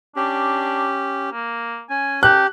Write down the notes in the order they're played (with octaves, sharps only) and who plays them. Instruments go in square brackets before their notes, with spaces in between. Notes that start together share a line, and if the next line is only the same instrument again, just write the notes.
[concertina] C#4 G4 [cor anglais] D4
[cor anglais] A#3
[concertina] C#4 [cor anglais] G#5
[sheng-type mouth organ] G4 [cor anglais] A4 [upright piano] F#6